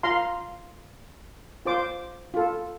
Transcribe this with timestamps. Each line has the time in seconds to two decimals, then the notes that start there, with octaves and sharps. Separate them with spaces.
0.03 F4 F5 A#5 C6
1.65 F4 C5 D6
2.34 F4 A4